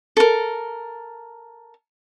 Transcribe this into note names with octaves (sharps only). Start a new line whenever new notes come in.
A4 A#4